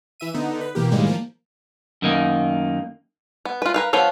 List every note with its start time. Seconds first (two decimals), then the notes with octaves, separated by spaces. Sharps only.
0.20 E3 E5 D#7
0.34 D3 B3 D#4
0.61 B4
0.75 B2 E3 A#3 G4
0.91 A2 D#3 G3 G#3 A#3
1.06 F3 A#3
2.02 F#2 D#3 A#3
3.45 B3
3.62 F4 B4
3.74 A#4 B4 F5
3.93 F3 B3 F4 C#5 F5